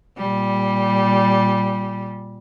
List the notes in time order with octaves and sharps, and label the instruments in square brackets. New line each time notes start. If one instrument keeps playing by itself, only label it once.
[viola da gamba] A#2 G3